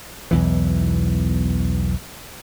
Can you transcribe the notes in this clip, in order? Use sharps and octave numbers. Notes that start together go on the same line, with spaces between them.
B1 E2 E3